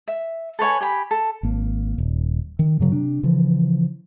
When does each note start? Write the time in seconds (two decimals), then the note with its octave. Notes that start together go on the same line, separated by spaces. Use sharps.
0.08 E5
0.59 A4 B4 C#5 G#5
0.81 G4 G#5 B5
1.11 A4
1.43 G#1 A#3
1.98 D#1
2.59 D#3
2.79 G2 C#3 F#3
2.92 C3 D4
3.23 C#3 E3 F3